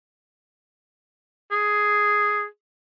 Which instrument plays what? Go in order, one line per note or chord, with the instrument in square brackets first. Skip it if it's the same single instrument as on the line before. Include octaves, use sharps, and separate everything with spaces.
[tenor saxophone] G#4